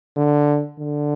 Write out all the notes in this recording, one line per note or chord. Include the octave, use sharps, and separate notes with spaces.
D3
D3